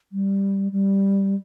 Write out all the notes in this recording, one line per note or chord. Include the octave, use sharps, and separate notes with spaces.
G3
G3